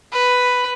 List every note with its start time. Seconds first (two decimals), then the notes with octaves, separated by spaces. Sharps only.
0.12 B4